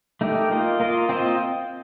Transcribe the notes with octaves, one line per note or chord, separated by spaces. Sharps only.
A3 D#4 G4 A#4
A#3 F4 A#4 D#5
A#3 F4 A#4 D#5
C4 F4 C5 D#5